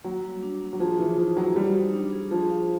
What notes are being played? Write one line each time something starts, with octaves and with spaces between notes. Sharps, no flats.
F#3 A#3
G3
D4
A#3
F#3
F3 G#4
E3 F4
F3 D#4
F#3 C5
G3 F#4
D#4
D4
G#4
F3 G#4
F5